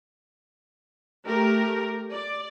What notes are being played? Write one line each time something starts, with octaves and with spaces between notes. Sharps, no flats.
A3 G4 A#4
D5